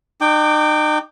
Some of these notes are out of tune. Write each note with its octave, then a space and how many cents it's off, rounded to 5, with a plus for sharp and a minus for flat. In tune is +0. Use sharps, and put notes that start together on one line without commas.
D#4 -40 G5 +0 D6 +0